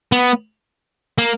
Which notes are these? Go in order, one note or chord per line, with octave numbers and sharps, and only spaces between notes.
B3
A#3